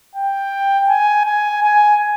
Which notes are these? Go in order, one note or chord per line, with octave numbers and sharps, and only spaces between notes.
G5
G#5
G#5
G#5